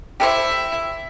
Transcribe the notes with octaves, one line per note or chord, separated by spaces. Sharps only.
E4 G4 A4 C5 E5